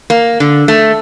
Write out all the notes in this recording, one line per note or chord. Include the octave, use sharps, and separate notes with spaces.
A#3
D3
A3